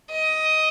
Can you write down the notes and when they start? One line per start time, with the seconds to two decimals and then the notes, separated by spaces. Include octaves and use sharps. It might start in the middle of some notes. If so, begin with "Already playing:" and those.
0.11 D#5